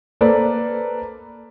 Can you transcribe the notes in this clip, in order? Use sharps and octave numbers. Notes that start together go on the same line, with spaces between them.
A#3 A4 B4 C5 D5